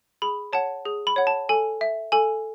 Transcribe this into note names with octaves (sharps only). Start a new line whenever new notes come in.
G#4 B5
C#5 F#5 A5
G#4
B5
C#5 F#5
A5
A4 G#5
E5
A4 G#5